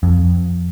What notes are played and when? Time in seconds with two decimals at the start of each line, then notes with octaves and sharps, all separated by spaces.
0.03 F2